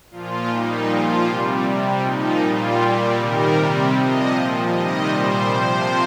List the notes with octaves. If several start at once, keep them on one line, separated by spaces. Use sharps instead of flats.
A#2 F3 F4
A#2 G3 D#4
A#2 F3 F4
C3 G3
C3 G3
A#2 F3 D#4
A#2 G3 F4
A#2 G3
C3 D#3 G3 A#4
C3 G3
C3 F3 D#5
A#2 F3
C3 D#3 G3 D#5
A#2 G3 C5
C3 F3 C5